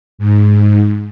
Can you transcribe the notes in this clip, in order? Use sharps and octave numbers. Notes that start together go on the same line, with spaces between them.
G#2